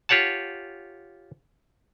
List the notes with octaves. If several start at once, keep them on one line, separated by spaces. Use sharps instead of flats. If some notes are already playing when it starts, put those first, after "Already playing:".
F4 G4 C#5 F#5 A5